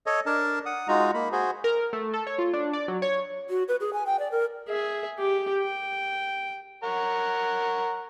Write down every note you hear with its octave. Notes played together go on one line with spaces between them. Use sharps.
A4 C#5 D#5
D4 A#4 A5
F#5 D#6
G#3 D#4 F4 F#4 A#5
A#3 B5
F#4 G#4 C5
A#4
A3
A4
C#5
F4
D4
D5
F#3
C#5
F#4
B4
G#4
G#5
G5
D5
A#4
G#4 E5
G4
G5
A#4 C#5 F#5